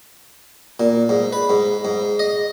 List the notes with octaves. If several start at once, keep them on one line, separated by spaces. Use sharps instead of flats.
A#2
G#2
B4
G#2
G#2
D#5